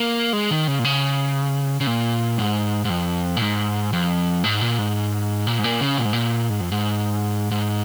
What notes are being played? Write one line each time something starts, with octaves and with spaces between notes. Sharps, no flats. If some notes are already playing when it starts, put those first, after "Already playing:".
Already playing: A#3
G#3
D#3
C#3
A#2
C#3
C#3
A#2
G#2
G#2
F2
A#2
G#2
F2
G#2
A#2
G#2
A#2
G#2
A#2
C#3
A#2
G#2
A#2
G#2
F2
G#2
G#2